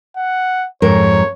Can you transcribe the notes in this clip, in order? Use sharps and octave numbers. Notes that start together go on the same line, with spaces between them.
F#5
F2 G#2 A#4 C#5